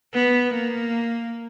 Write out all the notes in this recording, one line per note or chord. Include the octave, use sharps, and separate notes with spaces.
B3
A#3